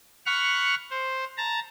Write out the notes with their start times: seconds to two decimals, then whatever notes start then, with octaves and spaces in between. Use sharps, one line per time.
0.26 F#5 B5 C#6 F6
0.90 C5
1.37 A5 A#5